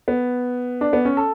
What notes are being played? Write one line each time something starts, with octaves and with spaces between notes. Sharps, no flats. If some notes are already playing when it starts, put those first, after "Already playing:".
B3
D4
B3
C#4
A4